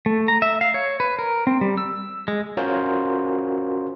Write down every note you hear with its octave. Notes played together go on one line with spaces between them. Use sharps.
A3
A#5
E5
F5
C#5
B4
A#4
C4
G3
E6
G#3
C#4 F4 F#4 A#4 C5 C#5